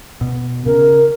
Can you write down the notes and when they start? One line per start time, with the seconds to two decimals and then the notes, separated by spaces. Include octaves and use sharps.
0.21 B2
0.66 C#3 A#4